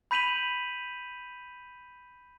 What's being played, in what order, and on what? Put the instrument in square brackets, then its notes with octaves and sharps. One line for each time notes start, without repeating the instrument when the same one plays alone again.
[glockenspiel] B5 G6 B6 D#7 F7 F#7